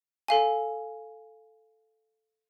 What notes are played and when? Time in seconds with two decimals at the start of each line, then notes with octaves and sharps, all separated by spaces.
0.28 A4 F5 G#5